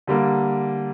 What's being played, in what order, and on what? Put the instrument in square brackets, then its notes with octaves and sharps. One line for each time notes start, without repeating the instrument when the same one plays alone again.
[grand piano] D3 G3 A#3